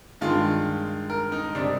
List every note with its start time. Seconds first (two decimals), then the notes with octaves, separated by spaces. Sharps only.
0.21 G2 D#3 G#3 F4
1.10 A#4
1.32 D#4
1.55 C3 G3 D4